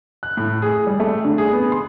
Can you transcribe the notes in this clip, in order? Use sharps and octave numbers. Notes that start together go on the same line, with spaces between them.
F#6
A2
G#4
G3
A3
D3
G#4
B3
C6